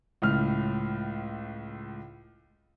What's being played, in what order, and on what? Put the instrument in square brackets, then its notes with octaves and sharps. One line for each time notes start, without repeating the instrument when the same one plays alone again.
[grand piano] C#2 A2 F6